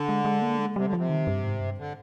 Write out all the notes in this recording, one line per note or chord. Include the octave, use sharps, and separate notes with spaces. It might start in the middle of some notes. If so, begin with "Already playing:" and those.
Already playing: D3
G#3
G#3
A#3
G#3
C3 G3
D3
C3 F3
D#3
G2
G#2
G2
D3